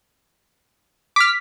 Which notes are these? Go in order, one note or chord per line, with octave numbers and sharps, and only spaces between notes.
D6 F6 B6